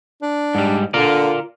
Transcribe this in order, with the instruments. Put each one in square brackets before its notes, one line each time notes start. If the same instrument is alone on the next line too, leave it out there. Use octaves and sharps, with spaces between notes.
[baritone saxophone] D4
[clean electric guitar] G#2 G3
[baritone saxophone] D3 [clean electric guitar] F4 A#4 D5